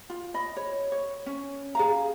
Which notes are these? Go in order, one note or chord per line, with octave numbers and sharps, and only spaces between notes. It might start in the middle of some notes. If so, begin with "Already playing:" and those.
F4
D#5 B5
C#5
C#5
C#4
G#4 F5 A#5